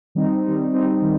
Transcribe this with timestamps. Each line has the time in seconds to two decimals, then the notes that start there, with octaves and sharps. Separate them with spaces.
0.15 D#3 G3 C4 D#4
0.44 D#3 G3 C4 D#4
0.73 D#3 G3 C4 D#4
1.02 D#3 G3